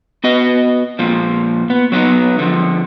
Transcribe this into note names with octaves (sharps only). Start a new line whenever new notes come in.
B3 F#4 D#5
F2 A#2 F3
B3
F#3 B3 D#4
D3 F3